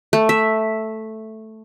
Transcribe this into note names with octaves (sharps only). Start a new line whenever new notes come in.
A3
E5